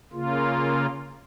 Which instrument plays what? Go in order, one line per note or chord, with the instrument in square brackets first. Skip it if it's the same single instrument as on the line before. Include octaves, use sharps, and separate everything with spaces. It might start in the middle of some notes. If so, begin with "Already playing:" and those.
[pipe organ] C#3 A#3 F4